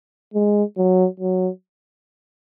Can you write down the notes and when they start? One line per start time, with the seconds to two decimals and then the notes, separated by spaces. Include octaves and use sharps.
0.34 G#3
0.77 F#3
1.20 F#3